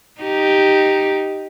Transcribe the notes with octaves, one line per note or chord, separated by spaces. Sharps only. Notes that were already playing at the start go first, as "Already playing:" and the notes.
D#4 G4